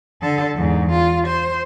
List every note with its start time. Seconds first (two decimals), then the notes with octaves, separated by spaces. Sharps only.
0.22 D3 A4
0.55 E2 G#2
0.92 F4
1.28 C5